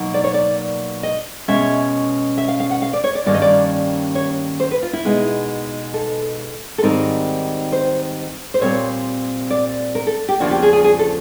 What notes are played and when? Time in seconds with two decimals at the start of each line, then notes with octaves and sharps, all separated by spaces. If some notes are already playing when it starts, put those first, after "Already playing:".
Already playing: B2 F#3 A#3 D#4
0.14 D5
0.24 C#5
0.34 D5
1.03 D#5
1.48 B2 G#3 C#4 E5
2.38 E5
2.48 F5
2.60 F5
2.71 F#5
2.82 F5
2.93 D5
3.04 C#5
3.15 D5
3.26 G2 D#3 G3 A#3 C#4 D5
3.34 D#5
3.42 D5
4.15 C#5
4.60 C5
4.71 B4
4.82 F4
4.93 E4
5.05 B2 G#3 B3 D#4
5.94 A4
6.78 A4
6.82 G#2 D#3 G3 C4 D#4 A#4
7.72 C5
8.54 C5
8.61 A#2 G3 C4 C#5
9.50 D5
9.95 A#4
10.07 A4
10.29 G4
10.40 E2 C#3 F3 A#3 D4 F#4
10.51 G4
10.63 G#4
10.73 G#4
10.84 G#4
10.99 A4